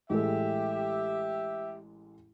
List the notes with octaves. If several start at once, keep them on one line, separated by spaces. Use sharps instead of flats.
A1 G#3 G4 A4 E5